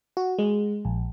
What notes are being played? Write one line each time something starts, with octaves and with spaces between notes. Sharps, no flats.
F#4
G#3
A#1